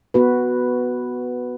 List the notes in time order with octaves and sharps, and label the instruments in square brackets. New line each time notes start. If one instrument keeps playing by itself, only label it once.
[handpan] B3 F#4 B4